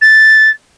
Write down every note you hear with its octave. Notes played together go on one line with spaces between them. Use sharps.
A6